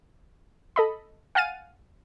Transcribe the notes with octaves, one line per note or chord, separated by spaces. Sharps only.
A4 D#5 B5
F5 F#5 G#5 F6 A6 D#7